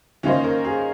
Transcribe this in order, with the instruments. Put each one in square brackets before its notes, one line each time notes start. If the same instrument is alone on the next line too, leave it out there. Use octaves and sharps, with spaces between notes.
[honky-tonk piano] D#3 A#3 F4 C5 D#5 [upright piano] C#4
[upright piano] A#4
G#4